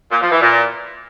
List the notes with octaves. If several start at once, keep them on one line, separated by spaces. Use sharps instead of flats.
A#2
F3
E3
A#2